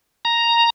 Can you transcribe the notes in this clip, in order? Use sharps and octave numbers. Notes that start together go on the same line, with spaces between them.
A#5